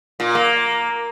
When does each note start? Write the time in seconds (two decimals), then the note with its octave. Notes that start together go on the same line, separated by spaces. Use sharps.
0.20 A#2
0.35 A#3